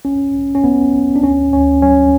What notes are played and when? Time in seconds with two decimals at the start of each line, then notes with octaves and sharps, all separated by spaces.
0.05 B1 C#4
0.35 B1
0.55 C#4
0.64 B1 B3
0.94 B1
1.16 D4
1.23 D2 C#4
1.52 D2 C#4
1.82 F#3 C#4